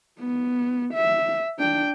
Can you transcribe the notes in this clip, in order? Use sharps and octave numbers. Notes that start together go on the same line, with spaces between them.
B3
E5
D4 G5